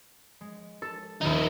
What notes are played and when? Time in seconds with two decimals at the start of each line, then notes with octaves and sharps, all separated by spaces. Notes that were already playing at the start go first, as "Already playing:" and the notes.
0.41 G#3
0.82 A4
1.21 D#1 D#2 D#3 D#4 E4